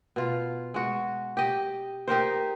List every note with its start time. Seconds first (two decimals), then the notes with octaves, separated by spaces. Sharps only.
0.16 B2 F4
0.74 G#3 F#4
1.37 G4 D#5
2.08 D#4 G4 A#4 C5